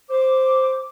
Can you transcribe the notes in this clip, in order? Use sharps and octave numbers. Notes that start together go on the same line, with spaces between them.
C5 D6